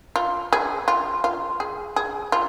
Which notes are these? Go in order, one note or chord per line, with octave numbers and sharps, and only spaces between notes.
F4
G#4
F4
F4
G#4
G#4
F4